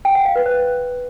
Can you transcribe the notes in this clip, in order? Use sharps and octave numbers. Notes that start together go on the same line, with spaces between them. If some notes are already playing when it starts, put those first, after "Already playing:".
G5
F#5
F5
B4
C5